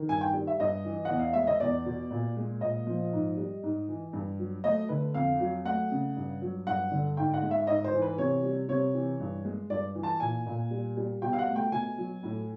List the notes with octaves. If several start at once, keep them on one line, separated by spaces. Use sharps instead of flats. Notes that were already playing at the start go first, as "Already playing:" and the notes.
Already playing: D#3
G2 G#5
G5
G3
E5
G2 D#5
E3
E2 F#5
F5
G#3 E5
D#5
E2 D5
B2
A#2
G#3
A#2 D#5
F3
G#2
G3
G#2
E3
G2
F#3
A3 D#5
D3 B4
F2 F5
F#3
A3 F#5
C#3
G2
F#3
G2 F#5
D3
G#2 G5
F#5
G#3
E5
G#2 D#5
C5
E3
B4
C3 C#5
G3
C3 C#5
E3
G2
G#3
G2 D5
E3
A5
A#2 G#5
A#2
G3
G3
B2 G5
F5
F#5
A3
G5
B2 G#5
F#3
A2